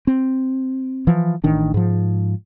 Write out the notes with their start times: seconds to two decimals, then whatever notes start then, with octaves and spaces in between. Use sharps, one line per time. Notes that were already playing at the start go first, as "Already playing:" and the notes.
0.07 C4
1.07 E3 F3
1.44 A1 D#3 D4
1.74 G#2 F3